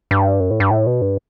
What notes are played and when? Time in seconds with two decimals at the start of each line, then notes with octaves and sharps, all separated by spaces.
0.11 G2
0.40 F#2
0.51 A2
0.60 G2
0.71 A2
0.87 B2
1.02 G2